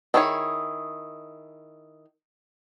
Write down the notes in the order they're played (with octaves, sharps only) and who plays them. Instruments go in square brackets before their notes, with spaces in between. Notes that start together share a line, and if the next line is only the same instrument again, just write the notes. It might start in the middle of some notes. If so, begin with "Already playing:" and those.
[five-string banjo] D#3 E4 G#4 C#5 G#5